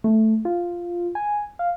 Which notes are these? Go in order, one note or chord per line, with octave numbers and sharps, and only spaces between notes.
A3
F4
G#5
F5